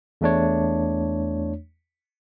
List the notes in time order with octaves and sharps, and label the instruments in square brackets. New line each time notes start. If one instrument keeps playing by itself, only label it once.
[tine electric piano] E2 A3 D4 C#5